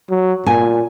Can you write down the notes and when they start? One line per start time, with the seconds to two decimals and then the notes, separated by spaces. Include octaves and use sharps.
0.10 F#3
0.46 A#2 G#5